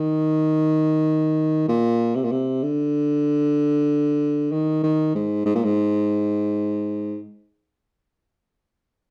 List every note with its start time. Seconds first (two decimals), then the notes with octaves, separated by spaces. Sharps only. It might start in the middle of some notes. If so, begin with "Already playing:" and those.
Already playing: D#3
1.68 A#2
2.15 C3
2.24 A#2
2.31 C3
2.63 D3
4.52 D#3
4.83 D#3
5.15 G#2
5.46 G#2
5.55 A#2
5.64 G#2